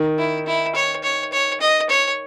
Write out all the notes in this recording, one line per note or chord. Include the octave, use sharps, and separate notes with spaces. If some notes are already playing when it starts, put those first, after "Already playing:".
Already playing: D#3
E4
E4
C#5
C#5
C#5
D#5
C#5